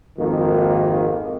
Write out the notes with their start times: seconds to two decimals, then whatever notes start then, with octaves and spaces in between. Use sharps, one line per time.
0.18 G#1 F2 D#3 A#3